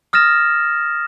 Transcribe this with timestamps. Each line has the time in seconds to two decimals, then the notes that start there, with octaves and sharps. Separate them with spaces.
0.13 D#6 F6 A6 A#6 E7